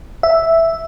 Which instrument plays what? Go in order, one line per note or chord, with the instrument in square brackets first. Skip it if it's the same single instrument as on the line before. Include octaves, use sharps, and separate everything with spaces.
[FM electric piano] E5